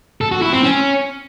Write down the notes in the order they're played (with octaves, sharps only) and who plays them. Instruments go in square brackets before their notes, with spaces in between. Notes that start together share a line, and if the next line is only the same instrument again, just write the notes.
[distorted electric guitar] A4
F#4
E4
C4
C#4